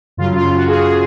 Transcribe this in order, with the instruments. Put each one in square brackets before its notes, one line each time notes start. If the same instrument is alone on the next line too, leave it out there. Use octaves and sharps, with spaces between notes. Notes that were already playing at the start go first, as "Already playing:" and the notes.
[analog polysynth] F#2 C#3 F#3 F4
F4
F#4
G#4
G#4